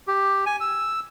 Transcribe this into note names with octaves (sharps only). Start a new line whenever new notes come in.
G4
G#5
E6